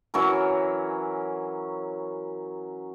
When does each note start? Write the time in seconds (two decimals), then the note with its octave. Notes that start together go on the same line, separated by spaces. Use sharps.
0.14 E3 F#3 C#4 A#4